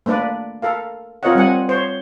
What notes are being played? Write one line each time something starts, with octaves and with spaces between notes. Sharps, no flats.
A3 A#3 D4 B4 D5
A4 A#4 F5
C4 F4 A#4 C#5 D#5 F#5
G3 C4 F#5 G#5
C5 C#5